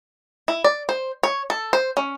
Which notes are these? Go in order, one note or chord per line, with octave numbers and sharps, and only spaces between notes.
E4
D5
C5
C#5
A4
C5
C#4